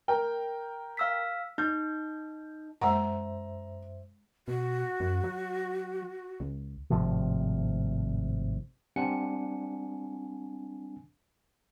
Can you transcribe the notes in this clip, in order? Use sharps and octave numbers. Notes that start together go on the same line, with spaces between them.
A#4 G5
F5 E6 B6
D#4 G6
F#2 G#3 C5 E5 F#5 A#5
B2 F#4
F#2
F#3
C#2
G#1 A2 C3 F3
G3 C4 D4 F#5 G#5 C#7